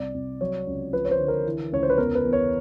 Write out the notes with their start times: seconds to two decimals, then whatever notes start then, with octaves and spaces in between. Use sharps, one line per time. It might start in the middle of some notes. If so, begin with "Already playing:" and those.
Already playing: C2 D5
0.14 C2
0.41 F#3 C#5
0.67 C#2
0.93 F3 B4
1.05 C#5
1.11 C5
1.19 D3
1.28 A#4
1.46 E3
1.72 C#2 C#5
1.83 C5
1.90 B4
1.98 E2 A#4
2.15 B4
2.25 E2
2.33 C#5